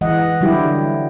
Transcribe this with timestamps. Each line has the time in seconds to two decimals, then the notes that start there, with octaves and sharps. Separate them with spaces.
0.01 E3 G#3 D#5 F#5
0.41 D3 F#3 G3 E4 G4